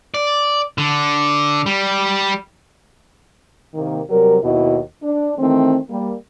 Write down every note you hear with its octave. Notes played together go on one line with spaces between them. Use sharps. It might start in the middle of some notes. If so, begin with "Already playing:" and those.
D5
D3
G3
C3 D#3 A#3
C3 F#3 G3 A#4
D#2 B2 E4 F#4 D#5
D4
D#3 E3 A3 C4
G3 A#3